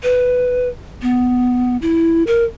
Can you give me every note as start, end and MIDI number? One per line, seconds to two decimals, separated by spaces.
0.03 0.68 71
1.02 1.77 59
1.82 2.23 64
2.27 2.44 70